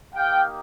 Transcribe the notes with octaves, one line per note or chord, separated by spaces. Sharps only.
A#3 D#4 G4 F5 G5